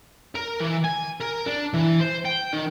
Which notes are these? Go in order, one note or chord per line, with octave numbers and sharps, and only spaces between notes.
A#4
E3
G#5
A#4
D4
E3
C5
G5
D#3